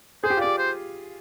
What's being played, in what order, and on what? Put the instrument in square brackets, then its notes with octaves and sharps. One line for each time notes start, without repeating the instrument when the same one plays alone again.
[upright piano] G#4 [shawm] C5
[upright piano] G4
F4
[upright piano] G4 [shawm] D5
[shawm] C5